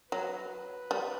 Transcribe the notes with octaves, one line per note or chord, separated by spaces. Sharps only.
F#3 B4
G3